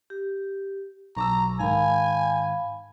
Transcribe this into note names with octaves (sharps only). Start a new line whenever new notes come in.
G4
B1 A#5 C#6 D6 E6
G#2 D#3 F5 G#5 B5